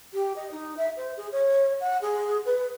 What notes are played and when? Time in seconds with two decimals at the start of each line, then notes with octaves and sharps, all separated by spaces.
0.14 G4
0.36 D#5
0.52 D#4
0.77 E5
0.97 C5
1.17 G#4
1.32 C#5
1.81 F#5
2.02 G#4
2.46 B4